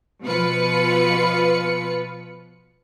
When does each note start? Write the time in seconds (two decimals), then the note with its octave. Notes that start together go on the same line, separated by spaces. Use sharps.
0.22 B2 F3 F4 B4 C#7